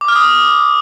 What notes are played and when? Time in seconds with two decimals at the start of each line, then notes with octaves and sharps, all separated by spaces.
0.01 D6
0.08 F6
0.16 D#6